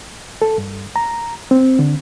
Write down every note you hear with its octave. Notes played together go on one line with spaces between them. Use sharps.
A4
G2
A#5
C4
D3